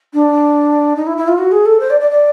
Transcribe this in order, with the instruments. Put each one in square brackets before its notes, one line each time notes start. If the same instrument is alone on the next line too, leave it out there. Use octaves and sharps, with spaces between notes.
[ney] D4
D#4
E4
E4
F4
F#4
G#4
A4
C5
D5
D5
D5